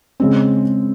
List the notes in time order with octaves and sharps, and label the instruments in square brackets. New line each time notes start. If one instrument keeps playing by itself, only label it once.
[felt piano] C#3 G#3 C4